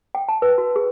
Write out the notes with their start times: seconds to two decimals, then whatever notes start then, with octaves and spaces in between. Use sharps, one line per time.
0.15 G5
0.28 A5
0.42 B4
0.58 F#4
0.76 G#4